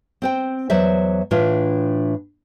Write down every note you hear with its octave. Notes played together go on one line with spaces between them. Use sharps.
C4 C5 G5
E2 F#3 C5 D5 E5
A2 E3 D4 F4